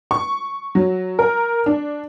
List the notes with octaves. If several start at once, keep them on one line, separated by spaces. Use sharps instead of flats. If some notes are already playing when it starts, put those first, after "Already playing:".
C#6
F#3
A#4
D4